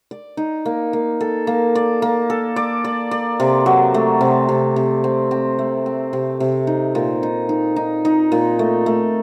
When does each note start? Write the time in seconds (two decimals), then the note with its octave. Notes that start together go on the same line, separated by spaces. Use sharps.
0.11 D5
0.37 D#4
0.65 A#3
0.93 A#3
1.21 A4
1.47 A#3
1.75 D5
2.02 A#3
2.30 A4
2.56 D5
2.84 D5
3.11 D5
3.40 C3
3.66 F#3
3.94 A3
4.21 C3
4.49 C3
4.76 C3
5.04 C4
5.31 C4
5.59 A3
5.86 C4
6.13 C3
6.40 C3
6.67 D#4
6.95 A#2
7.23 D#4
7.49 D#4
7.76 D#4
8.05 D#4
8.32 A#2
8.59 A3
8.86 A3